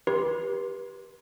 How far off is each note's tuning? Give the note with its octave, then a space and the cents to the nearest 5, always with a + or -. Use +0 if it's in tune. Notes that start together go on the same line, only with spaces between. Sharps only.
G4 +5 B4 -35 C6 +0